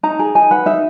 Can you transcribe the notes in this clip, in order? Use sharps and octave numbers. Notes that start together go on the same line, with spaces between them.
D#4 A#5
G#4
D#4 G#5
B4 F#5
D#4 E5